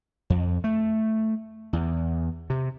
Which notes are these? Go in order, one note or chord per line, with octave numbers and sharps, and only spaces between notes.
F2
A3
E2
C3